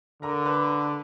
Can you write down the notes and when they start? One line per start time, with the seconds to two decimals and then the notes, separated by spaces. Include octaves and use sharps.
0.22 D3 A#4 A#5
0.45 B4 B5